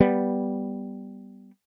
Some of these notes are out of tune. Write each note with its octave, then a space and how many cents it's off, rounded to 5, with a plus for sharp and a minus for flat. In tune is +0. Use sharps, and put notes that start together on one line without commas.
G3 +0 B3 +0